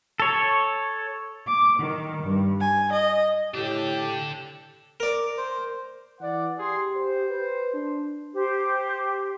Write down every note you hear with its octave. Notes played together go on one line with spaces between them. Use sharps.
A4 C#5
D6
D#3
G2
G#5
D#5
A2 D4 G4 A4
A#4 D5
C5
E3 D5 F#5
G4 G#4 C6
C5
B4
D4
G4 C5